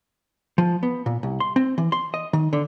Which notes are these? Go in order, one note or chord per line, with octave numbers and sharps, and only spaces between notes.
F3
B3
A#2
C2
C6
C4
E3
C6
D#5
D#3
D3